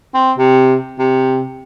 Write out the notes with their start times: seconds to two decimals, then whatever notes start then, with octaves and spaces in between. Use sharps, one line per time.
0.14 C4
0.38 C3
0.99 C3